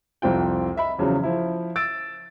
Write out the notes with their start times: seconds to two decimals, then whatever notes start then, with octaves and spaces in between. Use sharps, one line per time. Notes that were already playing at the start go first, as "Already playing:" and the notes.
0.22 C2 F2 C4 F4 G5
0.76 D#5 E5 B5
0.99 E2 C#3 F3 F#3
1.23 F3 E4
1.76 E6 A6 D7